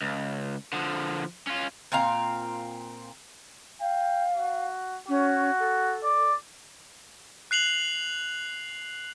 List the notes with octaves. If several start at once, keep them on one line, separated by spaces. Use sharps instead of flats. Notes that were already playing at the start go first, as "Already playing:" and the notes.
C#2
D3 F3
C#4 F4
A#2 C4 F5 A#5
F5 G5
F#4
C#4 F#4
A4
D5
F#6 C7 F7 F#7